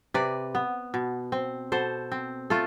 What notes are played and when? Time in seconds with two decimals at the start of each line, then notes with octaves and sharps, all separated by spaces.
0.14 C3 B4 D5
0.55 B3
0.94 B2
1.32 C4
1.72 B2 A4 C5
2.12 C4
2.50 A3 F4 A4